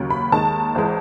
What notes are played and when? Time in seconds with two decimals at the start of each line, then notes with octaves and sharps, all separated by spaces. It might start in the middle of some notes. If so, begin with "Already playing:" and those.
Already playing: D#2 C#3 F#3
0.10 B5
0.32 D#2 D#3 G#3 A5
0.75 G#1 E3 G#3